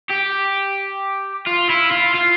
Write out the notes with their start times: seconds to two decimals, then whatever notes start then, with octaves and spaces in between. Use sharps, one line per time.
0.10 G4
1.47 F4
1.69 E4
1.91 F4
2.14 F4